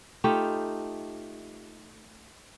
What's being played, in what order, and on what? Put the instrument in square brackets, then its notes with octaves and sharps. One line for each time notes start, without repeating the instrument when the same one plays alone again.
[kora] A3 D#4 F4 G4